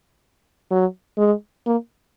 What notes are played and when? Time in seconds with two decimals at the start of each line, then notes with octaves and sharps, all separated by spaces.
0.71 F#3
1.18 G#3
1.66 A#3